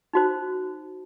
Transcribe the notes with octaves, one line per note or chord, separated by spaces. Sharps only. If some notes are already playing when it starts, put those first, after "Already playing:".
D#4 F#4 C5